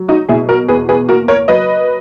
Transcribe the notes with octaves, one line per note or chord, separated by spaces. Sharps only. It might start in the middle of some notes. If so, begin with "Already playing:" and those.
Already playing: F#3
D#4 F#4
B2 E4 G#4
F#4 A#4
E2 G#4 B4
G#4 B4
A#3 F#4 A#4
A#4 C#5
F#3 B4 D#5